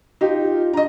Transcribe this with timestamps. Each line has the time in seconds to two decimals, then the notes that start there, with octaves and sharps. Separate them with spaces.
0.21 D#4 F4 G4
0.73 D4 D#5 A#5